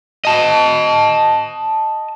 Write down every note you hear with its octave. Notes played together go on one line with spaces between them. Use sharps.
D#5 A5